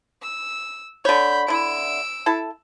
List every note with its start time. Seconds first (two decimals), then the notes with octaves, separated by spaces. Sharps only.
0.22 E6
1.05 D3 C#5 B5 G6
1.48 D3 E4 E6 D7
2.26 E4 A4 A5